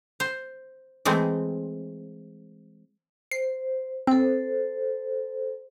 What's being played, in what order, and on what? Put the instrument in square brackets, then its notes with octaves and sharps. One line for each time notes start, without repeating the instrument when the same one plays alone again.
[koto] C5
E3 G#3 A3 C4
[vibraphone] C5 [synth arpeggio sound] C7
[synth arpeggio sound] C4 [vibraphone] A4 C5